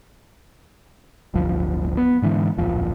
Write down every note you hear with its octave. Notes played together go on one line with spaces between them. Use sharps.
D1 G1 D2 F3
B3
G#2 D3 E3 G#3
D1 A#1 F2 F3